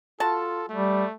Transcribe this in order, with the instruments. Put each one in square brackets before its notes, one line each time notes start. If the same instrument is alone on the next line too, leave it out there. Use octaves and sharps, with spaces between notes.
[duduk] F4 [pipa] F#4 A5 [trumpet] A4
[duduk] G3 [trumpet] A3